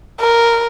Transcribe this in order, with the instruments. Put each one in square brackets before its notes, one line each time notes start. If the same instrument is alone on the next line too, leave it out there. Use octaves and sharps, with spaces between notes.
[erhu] A#4